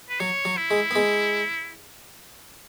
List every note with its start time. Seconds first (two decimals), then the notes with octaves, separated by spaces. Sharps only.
0.09 B4
0.20 F#3 C#5
0.45 F#3
0.57 E4
0.71 G#3
0.91 B3
0.96 G#3